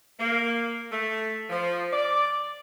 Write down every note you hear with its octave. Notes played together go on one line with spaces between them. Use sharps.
A#3
A3
F3
D5